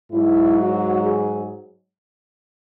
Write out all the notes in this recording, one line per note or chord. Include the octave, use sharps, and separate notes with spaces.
G#2 F#3 E4
F#4
G#4